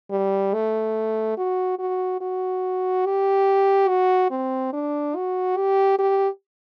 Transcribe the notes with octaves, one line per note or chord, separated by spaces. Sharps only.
G3
A3
F#4
F#4
F#4
G4
F#4
C4
D4
F#4
G4
G4